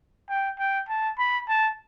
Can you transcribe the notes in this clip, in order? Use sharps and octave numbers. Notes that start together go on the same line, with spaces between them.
G5
G5
A5
B5
A5